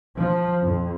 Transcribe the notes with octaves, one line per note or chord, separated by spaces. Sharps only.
F3
F2